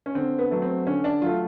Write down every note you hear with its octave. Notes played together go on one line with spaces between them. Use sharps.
C#4
D3 C4
B3
F#3 A3
C4
D3 C#4
D4
F#3 A3 F4